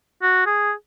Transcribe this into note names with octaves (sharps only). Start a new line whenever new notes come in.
F#4
G#4